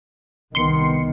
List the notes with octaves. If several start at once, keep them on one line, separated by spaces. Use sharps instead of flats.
C2 D#3 B3 C6 C7 C#7